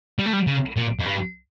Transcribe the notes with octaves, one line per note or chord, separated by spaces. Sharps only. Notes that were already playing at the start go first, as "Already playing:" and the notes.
G3
A3
G3
C#3
A#2
F2
G2